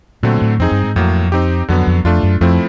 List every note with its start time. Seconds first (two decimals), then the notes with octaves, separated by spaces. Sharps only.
0.23 A#2 D3 F#3 A3 C4
0.42 A2
0.59 F2 C4 D#4 G#4
0.71 G2
0.83 G#2
0.96 F2 A2 F#3 A#3
1.32 C4 D#4 G4
1.68 F2 D3 F#3 B3
1.87 F2
2.04 F2 A3 D4 F4
2.23 F#2
2.41 F2 F3 A3 C4 E4